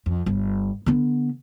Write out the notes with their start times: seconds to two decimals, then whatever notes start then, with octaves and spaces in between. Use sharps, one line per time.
0.06 F2
0.26 G1
0.86 D3 B3